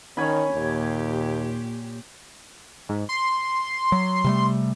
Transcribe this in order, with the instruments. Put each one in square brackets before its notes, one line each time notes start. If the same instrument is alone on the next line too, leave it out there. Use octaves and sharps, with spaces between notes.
[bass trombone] D#3 [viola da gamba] C#4 [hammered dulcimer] C#5 G#5 B5
[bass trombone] D#2 [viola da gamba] A#2 G4
[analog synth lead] G#2
C6
[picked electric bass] F#3
C3 G3 A3